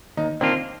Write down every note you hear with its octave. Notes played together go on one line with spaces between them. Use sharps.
D#2 D#4
D#3 A#3 C4 D4 F4